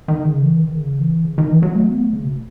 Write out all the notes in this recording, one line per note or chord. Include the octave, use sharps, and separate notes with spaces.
D#3
C#3
E3
D#3
C#3
E3
C#3
D#3
E3
F#3
A3
B3
A3
C#3
B2